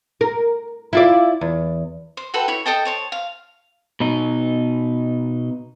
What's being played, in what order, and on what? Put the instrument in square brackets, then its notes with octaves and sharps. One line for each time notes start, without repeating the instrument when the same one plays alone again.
[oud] A#4
E4 F4 D5
E2
[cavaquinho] C5
F#4 A4 B4 G5
E4 C#5
A4 D#5 G5 A5
C5 C#5 A5
F5
[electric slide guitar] B2 D#4